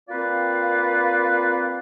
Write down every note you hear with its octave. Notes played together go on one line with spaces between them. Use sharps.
A#3 C4 F4 B4 D5 F5